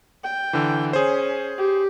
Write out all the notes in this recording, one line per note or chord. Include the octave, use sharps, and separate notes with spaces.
G5
D3 E3
C#4 G#4 C5
G4